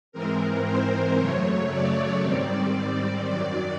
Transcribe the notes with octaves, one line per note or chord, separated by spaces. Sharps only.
G#2 E3 G#3 C4 A#4
C5
F#2 C#3 F#3 A3 C#5
D5
G#2 D#3 G3 C4
F#2 D#3 F#3 D5